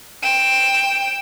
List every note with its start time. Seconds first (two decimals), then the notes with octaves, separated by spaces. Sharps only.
0.23 G5 E7